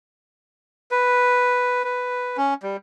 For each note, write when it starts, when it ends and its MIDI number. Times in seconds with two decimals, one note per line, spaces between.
0.91 1.84 71
1.84 2.37 71
2.37 2.54 61
2.63 2.77 55